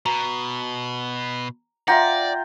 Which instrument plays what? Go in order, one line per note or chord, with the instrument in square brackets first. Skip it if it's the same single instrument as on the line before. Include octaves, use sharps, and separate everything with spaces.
[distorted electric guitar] B2 [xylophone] A#5
[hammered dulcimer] F4 G5 A#5 [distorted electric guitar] D5 [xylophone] E5 F#5